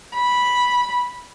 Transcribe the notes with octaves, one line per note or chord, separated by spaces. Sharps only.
B5